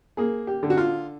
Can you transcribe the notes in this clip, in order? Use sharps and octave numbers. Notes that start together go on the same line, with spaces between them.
A#3 G#4
G4
D3
F#4
F4